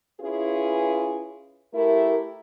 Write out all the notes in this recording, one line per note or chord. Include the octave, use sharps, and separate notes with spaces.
C#4 E4 F4 G#4 B4
A3 E4 G4 A#4